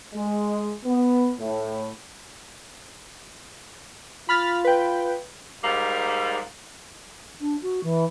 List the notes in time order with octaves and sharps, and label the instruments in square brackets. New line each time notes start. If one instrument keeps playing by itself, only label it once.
[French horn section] G#3
B3
A2
[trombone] F4 [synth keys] B5 F6 A6
[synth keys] B4 G5
[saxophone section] G#2 G3 A#3
[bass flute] D4
F#4
E3